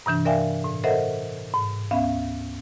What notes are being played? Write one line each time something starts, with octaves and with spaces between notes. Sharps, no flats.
G2 C3 E3 D4
A#4 D5 E5 F5 G5 G#5
A2
A4 A#4 C5 D#5 E5 F#5
G#2
D2 B3 C#4 E5 F5 B5